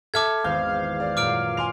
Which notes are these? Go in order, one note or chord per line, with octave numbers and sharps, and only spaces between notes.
A4 E5 A5 D6 F6 G#6
G#1 E2 F5 G6
D5
F#2 A#2 D6 F6 D7
G#5 C6 F7